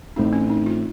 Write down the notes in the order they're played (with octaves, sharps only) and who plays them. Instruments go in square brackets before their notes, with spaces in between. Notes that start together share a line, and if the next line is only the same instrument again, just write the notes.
[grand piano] A1 A2 A3 C4 [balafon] D#4
[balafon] C#4
D#4
F4